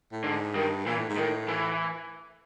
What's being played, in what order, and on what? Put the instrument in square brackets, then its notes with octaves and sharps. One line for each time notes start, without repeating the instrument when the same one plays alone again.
[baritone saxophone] A2
[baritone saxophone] G#2 [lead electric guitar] D3
[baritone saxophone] G2 [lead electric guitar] D#3
[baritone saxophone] A#2 [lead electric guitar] E3
[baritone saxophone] A2
G#2
[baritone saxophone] A2 [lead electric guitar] D#3
[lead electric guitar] E3